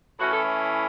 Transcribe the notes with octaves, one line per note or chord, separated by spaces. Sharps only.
A2 E3 C#4 F#4
A4